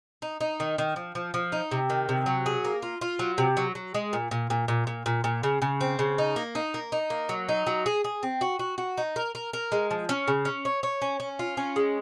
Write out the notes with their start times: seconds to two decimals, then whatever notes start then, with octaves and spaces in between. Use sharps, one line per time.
0.22 D#4
0.40 D#4
0.60 D#3
0.78 D#3
0.96 F3
1.15 F3
1.34 F3
1.52 D#4
1.71 C3
1.90 D#3
2.09 C3
2.26 F#3
2.46 G#4
2.65 A#3
2.82 F4
3.01 F4
3.19 F#3
3.38 C3
3.57 F#3
3.75 F#3
3.94 G#3
4.13 A#2
4.31 A#2
4.50 A#2
4.68 A#2
4.87 A#2
5.06 A#2
5.24 A#2
5.43 C#3
5.62 C#3
5.81 C4
5.99 C#3
6.18 D#4
6.36 A#3
6.55 D#4
6.74 A#3
6.92 D#4
7.10 A#3
7.29 F#3
7.49 D#4
7.67 F#3
7.86 G#4
8.04 G#4
8.23 C4
8.41 F#4
8.59 F#4
8.78 F#4
8.98 D#4
9.16 A#4
9.35 A#4
9.53 A#4
9.72 G#3
9.91 F3
10.09 C#4
10.28 C#3
10.45 C#4
10.65 C#5
10.83 C#5
11.02 C#4
11.20 C#4
11.39 F4
11.57 C#4
11.76 G#3